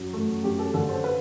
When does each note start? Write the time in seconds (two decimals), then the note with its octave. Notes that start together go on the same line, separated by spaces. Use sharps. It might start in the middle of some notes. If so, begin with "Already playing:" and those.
Already playing: F#2 F#3
0.13 A3
0.44 F#2 G4
0.59 A4
0.74 D3 A4
0.89 C5
1.04 B4